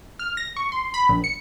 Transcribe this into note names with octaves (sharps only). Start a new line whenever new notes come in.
F6
A#6
C#6
C6
B5
A#1
C#7